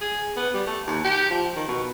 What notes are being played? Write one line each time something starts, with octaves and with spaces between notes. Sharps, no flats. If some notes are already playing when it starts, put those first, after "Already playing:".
G#4
B3
G3
A3
D#2
G4
F3
D#3
B2